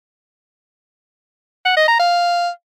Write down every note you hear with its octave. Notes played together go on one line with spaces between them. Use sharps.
F#5
D#5
A#5
F5